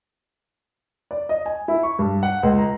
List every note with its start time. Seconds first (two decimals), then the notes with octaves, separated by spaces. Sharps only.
1.11 D5
1.29 D#5
1.46 G#5
1.68 E4
1.83 C#6
1.99 G2
2.23 F#5
2.43 C#2
2.59 A#5